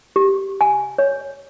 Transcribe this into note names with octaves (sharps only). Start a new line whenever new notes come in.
G4
G#5
C#5